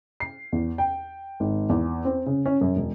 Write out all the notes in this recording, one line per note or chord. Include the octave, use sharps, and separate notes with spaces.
C7
E2
G5
G#1
E2
C4
C#3
C#4
F#2
E1